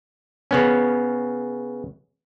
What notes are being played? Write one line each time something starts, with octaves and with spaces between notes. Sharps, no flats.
C#3 B3 C#4